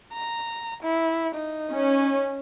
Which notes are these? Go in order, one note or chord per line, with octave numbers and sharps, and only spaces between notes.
A#5
E4
D#4
C#4